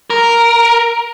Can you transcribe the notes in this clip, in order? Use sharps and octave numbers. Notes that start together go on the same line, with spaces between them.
A#4